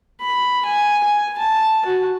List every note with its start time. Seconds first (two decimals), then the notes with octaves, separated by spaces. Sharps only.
0.21 B5
0.65 G#5
1.03 G#5
1.38 A5
1.86 F#4